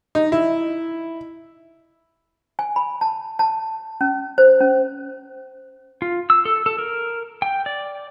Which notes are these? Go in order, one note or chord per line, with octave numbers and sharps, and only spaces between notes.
D#4
E4
G#5
B5
A5
A5
C#4
C5
C#4
F4
E6
A4
A4
A#4
G5
D5